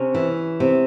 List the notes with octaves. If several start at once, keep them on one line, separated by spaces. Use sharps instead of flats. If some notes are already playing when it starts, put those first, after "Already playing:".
Already playing: C3 C#4
E3
C3